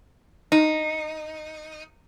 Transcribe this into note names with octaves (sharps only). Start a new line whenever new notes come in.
D#4